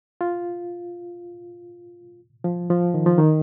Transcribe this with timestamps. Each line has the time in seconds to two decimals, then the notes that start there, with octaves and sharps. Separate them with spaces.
0.21 F4
2.44 F3
2.70 F3
2.94 D#3
3.06 F3
3.18 D#3